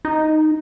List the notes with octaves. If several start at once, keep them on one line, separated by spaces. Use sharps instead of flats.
D#4